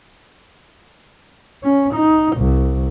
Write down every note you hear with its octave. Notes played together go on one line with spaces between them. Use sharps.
C#4
D#4
C2